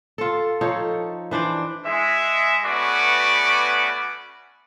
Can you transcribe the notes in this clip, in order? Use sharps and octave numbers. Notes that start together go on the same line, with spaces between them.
F4 A4
F3 D#4 A4 C#5
E3 D4 C5 D5
G#3 E5
A3 B3 C#4 F#4 B4 D5